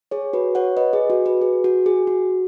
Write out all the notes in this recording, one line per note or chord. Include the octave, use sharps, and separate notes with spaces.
G#4 C#5
F#4 B4
C#5 F#5
B4 D#5
G#4
F#4
F#4 B4
G#4
F#4
G#4
F#4